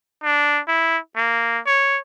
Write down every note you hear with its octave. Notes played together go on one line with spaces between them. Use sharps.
D4
E4
A#3
C#5